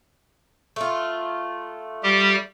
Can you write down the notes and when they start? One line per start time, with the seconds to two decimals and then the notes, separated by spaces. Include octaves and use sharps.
0.76 A3 F4
2.03 G3 G4